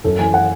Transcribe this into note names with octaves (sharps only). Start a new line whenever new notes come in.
F#2 A4
E3 G#5
F#5